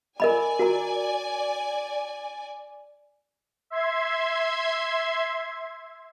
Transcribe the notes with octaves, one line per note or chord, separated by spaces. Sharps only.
A#4 D5 D#5 G#5 B5
F#4 A#4 A#5
E5 C6 G#6